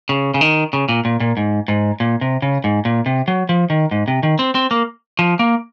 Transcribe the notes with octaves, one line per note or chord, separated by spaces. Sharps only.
C#3
C#3
D#3
C#3
A#2
A#2
A#2
G#2
G#2
A#2
C3
C#3
G#2
A#2
C3
F#3
F3
D#3
G#2
C3
D#3
C4
C4
A#3
F3
A#3